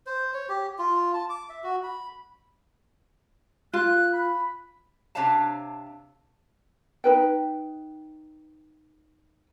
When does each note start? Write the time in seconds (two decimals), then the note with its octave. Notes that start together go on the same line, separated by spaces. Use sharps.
0.06 C5
0.34 C#5
0.49 G4
0.78 F4
1.14 A5
1.29 D6
1.49 E5
1.63 F#4
1.83 B5
3.73 F4 F#6
4.13 B5
5.15 C3 D4 C#5 F5 A5
7.04 D#4 B4 G5